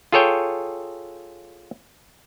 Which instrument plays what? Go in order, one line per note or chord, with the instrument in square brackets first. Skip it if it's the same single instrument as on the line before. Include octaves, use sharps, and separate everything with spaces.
[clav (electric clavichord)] F4 G#4 A4 C#5 G5